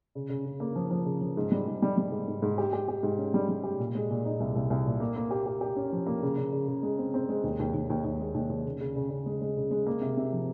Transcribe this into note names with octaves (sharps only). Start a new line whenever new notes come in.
C#3
C#3
C#3
A#3
F3
F3
C#3
F3
G#2
G3
G#2
G3
G3
G#2
G#2
G#2
G4
G4
G4
G#2
C#4
G3
G3
G4
A#2
G#3
A#2
D#4
C2
C2
C2
A#2
A#3
A#3
G4
G4
G4
C#4
F3
A#3
C#3
C#3
C#3
C#3
G#3
C4
C4
G#3
D#2
D#2
D#2
D#2
D#2
G#3
D#2
D#2
C#3
C#3
C#3
C#3
G#3
G#3
C#3
G#3
A#3
C3
C3
F3